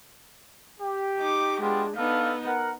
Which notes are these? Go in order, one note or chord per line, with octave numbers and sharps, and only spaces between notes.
G4
D#4 D6
G#3 B3 D4 F4 G4
B3 D4 D#4 A4 F5
A#4 F#5